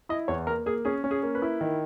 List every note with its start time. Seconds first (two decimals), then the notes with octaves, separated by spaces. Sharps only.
0.09 E4 D#5
0.28 E2 C#5
0.47 A#3 A#4
0.66 A#3 G#4
0.85 C#4 G#4
1.04 C#4
1.11 G#4
1.23 A#3
1.35 B4
1.42 E4
1.61 D#3